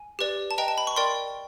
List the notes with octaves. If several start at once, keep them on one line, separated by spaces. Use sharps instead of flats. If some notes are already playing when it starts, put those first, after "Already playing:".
Already playing: G#5
G4 B4 D5
A5
B4 D#5 G5 A#5
A5
B5
C#6
A#4 D5 G5 C6